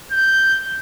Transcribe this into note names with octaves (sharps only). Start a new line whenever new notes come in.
G6